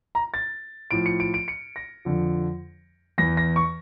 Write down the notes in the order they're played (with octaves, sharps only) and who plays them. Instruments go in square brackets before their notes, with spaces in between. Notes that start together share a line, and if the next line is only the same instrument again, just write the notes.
[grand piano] A#5
A6
A2 F3 D7
C#7
D7
D7
C#7
A#6
F2 D3 F3
E2 E3 A#6
A#6
C#6